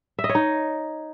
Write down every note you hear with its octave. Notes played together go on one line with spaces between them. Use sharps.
E5
D#5
C#5
D#4